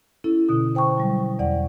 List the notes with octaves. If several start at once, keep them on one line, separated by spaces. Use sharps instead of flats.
C#4 E4 A4
B2 D3 D#6
C5 G5 A5 C#6
F#3 G3
E2 D5 F#5